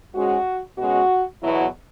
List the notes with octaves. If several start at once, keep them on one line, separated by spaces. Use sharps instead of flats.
G#2 G#3 C#4 F#4
B2 G#3 C#4 F#4
E2 B2 F#3 B3 E4